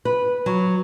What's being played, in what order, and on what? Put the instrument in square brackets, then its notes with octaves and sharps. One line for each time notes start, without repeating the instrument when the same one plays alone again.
[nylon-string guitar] B4
F#3